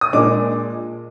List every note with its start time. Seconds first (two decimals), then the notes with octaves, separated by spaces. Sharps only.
0.01 D#6
0.13 A#2 G#3 D4 D6